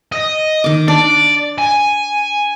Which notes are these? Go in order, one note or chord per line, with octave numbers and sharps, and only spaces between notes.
D#5
D#3 D6
D4 D5
G#5